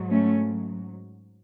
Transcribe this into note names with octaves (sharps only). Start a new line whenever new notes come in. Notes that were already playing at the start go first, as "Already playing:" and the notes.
Already playing: G#2 F#3
A3 C#4